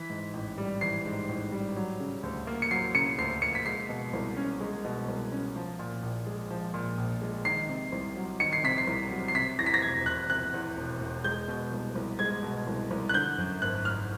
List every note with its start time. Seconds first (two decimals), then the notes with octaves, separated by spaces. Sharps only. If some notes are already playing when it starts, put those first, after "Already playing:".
Already playing: E3 B6
0.10 G#2
0.33 A1
0.58 G3
0.81 E3 C7
1.05 G#2
1.29 A1
1.52 G3
1.76 F#3
2.00 C#3
2.23 D2
2.47 A#3
2.62 C#7
2.71 F#3 C7
2.94 C#3 C#7
3.18 D2 C7
3.42 A#3 C#7
3.55 B6
3.66 G#3 C7
3.89 B2
4.13 C2
4.37 C#4
4.60 G#3
4.85 B2
5.08 C2
5.32 C#4
5.56 F3
5.79 A#2
6.03 A#1
6.27 G#3
6.50 F3
6.74 A#2
6.98 A#1
7.22 G#3
7.45 D#3 C7
7.69 C3
7.92 C2
8.16 F#3
8.40 D#3 C#7
8.53 C7
8.64 C3 B6
8.78 C7
8.87 C2
9.11 F#3
9.28 C7
9.35 C3 B6
9.59 E2 A#6
9.66 B6
9.74 A#6
9.82 E1 G#6
10.06 E1 F#6
10.30 C3 F#6
10.54 E2
10.77 E1
11.01 E1
11.24 G#3 G6
11.48 B2
11.72 C2
11.95 C2
12.19 G#3 G#6
12.43 B2
12.67 C2
12.91 C2
13.09 F#6
13.14 D3 G6
13.38 F#2
13.62 G#1 F#6
13.85 G#1 F6